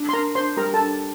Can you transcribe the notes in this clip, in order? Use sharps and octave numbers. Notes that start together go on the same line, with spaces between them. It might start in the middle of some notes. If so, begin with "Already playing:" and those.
Already playing: D4
C6
D4 A#4 A#5
D4 C5 C6
G3 A#4 A#5
A4 A5
D4